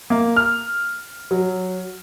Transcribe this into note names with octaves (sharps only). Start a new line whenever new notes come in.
A#3
F6
F#3